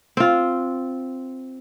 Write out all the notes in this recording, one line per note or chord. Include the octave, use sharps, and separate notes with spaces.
C4 F4